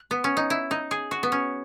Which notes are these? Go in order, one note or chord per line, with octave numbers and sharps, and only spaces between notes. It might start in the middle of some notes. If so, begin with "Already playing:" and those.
Already playing: A3
B3
C#4
D#4
E4
D#4
G#4
F#4
B3
C#4